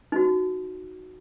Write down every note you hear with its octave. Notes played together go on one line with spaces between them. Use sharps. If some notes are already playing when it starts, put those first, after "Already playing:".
D#4 F#4